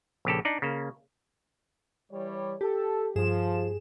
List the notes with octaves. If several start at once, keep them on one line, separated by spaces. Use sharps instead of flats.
A#1 C#3 G4 A4
D4 D#4 D5
C#3 A#3
E3 G3 C#5
G4 A4
G2 F3 G#4 E7